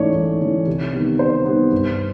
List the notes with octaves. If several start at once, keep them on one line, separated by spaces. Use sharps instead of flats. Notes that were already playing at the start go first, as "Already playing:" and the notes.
Already playing: G#2 E3 A3 C#4 C#5 D5
G#2
E3 A3 C#4
C3
D#3 G3 B3
C3 C5
D#3 G3 B3
G2